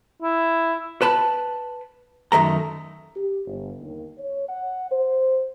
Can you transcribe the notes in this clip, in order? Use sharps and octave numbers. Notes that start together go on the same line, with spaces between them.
E4
B4 A5 B5
F#2 D#3 A3 A#5
G4
G1
D#2
C#5
F#5
C5